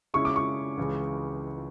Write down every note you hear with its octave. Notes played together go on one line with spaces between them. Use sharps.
C#3 G#3 C#4 E4 C#6
D6
C#6
C#2 C#3 E3